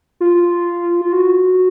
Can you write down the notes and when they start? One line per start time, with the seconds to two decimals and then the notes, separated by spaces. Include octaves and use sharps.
0.21 F4
1.01 F4
1.12 F#4